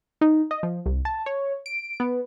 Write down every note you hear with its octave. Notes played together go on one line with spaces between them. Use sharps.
D#4
D#5
F3
C2
A5
C#5
D7
B3